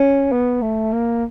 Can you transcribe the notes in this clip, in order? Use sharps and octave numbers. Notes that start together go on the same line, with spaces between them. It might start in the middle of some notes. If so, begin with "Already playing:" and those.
Already playing: C#4
B3
A3
A#3